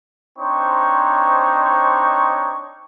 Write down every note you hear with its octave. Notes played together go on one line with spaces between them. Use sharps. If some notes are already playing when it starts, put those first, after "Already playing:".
C4 D4 D#4 C5 C#5 C#6